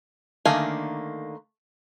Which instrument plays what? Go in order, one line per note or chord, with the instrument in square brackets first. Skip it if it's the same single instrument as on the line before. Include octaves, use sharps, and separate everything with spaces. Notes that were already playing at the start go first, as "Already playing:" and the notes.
[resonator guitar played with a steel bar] D3 D#3 A#3 [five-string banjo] A3 F5 G#5